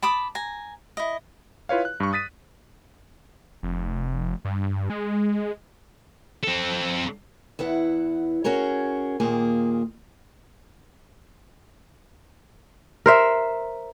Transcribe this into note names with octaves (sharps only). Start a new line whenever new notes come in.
A5 B5 D6 D#6
G#5 A#5
E4 D#5
E4 F4 B4 C#5 F5
F#6
G2 C#6
D#6 A6 B6 D#7
F1
G2
G#3
C4 A4
E2 E4 B4 F#5
C#4 F#4 G#4 A#4 C#5
D#2 A#2 A#3 G#4
A#4 C5 E5